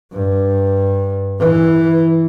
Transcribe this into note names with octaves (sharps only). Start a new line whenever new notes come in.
G2
E3